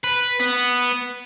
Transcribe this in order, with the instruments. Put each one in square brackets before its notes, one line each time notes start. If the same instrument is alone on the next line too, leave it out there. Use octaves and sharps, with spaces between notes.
[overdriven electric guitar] B4
B3